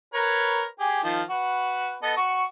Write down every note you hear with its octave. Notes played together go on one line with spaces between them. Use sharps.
A#4 B4 C#5
G4 G#4
D#3 F3
F#4 B4
B3 A4 D#5
F#4 C#6